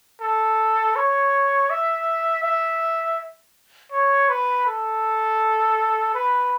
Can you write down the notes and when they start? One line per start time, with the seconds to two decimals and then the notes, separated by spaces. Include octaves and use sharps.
0.21 A4
0.96 C#5
1.70 E5
2.43 E5
3.92 C#5
4.29 B4
4.66 A4
6.15 B4